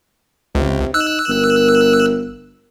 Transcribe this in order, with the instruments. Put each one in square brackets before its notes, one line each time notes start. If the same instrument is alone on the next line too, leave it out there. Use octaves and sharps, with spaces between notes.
[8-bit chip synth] C#2 [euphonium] C3
[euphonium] D#4 [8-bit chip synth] E6 F#6
[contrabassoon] G1 [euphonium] A#4